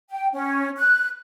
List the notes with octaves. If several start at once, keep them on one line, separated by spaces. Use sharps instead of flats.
G5
C#4
F#6